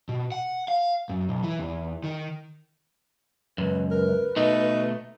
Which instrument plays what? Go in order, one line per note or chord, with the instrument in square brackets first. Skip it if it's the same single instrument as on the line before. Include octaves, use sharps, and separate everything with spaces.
[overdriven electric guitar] B2
F#5
F5
F#2
B1
E3
E2
D#3
[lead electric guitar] C#2 F#2 [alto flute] B4
[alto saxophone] A#4 [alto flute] B4
[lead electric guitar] B2 A3 [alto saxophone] D#4